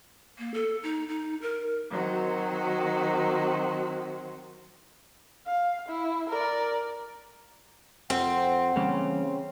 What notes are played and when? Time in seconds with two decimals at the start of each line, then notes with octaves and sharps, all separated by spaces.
0.39 A#3
0.54 A4
0.83 D#4
1.08 D#4
1.42 A#4
1.90 D#3 F#3 C4 F#4
5.47 F5
5.88 E4
6.29 A#4 D5
8.10 F2 C4 F#5
8.76 C#3 E3 G3 A#3 C#4